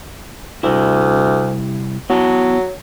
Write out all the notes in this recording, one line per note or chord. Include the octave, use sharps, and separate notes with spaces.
D2 C3 G3 E4
F#3 B3 E4 A5